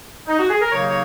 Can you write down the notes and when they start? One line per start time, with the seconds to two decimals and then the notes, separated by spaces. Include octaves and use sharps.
0.28 D#4
0.39 F#4
0.50 G#4
0.61 A#4
0.71 D#2 C#3 F#3 A#3 D#4 C#5
0.88 C#5